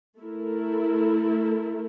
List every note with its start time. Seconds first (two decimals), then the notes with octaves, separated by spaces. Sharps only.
0.20 A3 E4 A#4